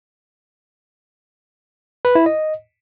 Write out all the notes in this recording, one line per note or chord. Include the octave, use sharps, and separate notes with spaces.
B4
E4
D#5